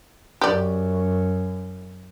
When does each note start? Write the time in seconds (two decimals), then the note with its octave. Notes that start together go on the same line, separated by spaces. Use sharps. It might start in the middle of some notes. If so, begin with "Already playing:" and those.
0.41 F#2 G4 D5